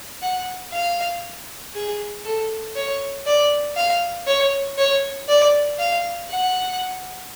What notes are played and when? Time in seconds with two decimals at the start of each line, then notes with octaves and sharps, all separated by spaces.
0.22 F#5
0.73 F5
1.74 G#4
2.25 A4
2.75 C#5
3.26 D5
3.77 F5
4.27 C#5
4.78 C#5
5.28 D5
5.79 F5
6.30 F#5